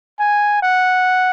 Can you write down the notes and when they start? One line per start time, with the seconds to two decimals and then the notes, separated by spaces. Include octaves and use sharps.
0.19 G#5
0.63 F#5